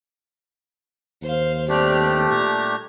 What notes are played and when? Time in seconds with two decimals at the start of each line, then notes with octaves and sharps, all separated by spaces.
1.22 D#2 C5 F5
1.69 G3 A3 C4 D4 G4 F6
2.31 A#2 A#5 G#6